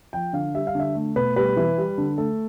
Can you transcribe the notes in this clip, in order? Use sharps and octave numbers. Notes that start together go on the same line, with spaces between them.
F3 G5
D3 F5
G3 E5
F5
D3 E5
A3
B2 B4
G3 B4
E3
G3
D3
A3 A4